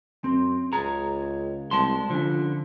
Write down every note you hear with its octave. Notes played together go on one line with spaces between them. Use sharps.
F#2 C4
C#2 G#4 A#5
C2 G#3 A5 C6
D3 F3 C#4